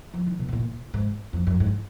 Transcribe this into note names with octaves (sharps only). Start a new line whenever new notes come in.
F3
D#3
B2
G#2
A#2
G#2
F2
F#2
G#2